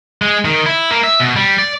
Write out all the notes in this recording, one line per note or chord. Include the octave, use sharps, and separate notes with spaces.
G#3
D#3
E4
A#3
E5
B2
G3
D5